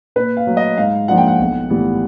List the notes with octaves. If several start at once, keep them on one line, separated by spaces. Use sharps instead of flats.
A#2 B4
F5
F#3 A3
D#5
G#2 F5
F3 A#3 D4 F4 F#5
G5
F#5
B1
A2 E3 G3 B3